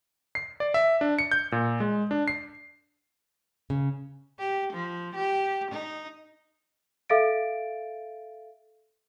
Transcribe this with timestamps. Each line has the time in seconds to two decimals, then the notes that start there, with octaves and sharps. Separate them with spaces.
0.35 C7
0.60 D5
0.74 E5
1.01 D4
1.19 C#7
1.31 G6
1.52 A#2
1.80 G#3
2.11 D4
2.28 C7
3.70 C#3
4.39 G4
4.73 F3
5.15 G4
5.71 D#4
7.09 A4 E5 F5 A6 D7